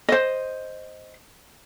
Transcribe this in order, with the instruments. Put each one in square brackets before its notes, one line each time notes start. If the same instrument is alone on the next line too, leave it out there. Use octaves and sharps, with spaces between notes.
[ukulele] C5 D#5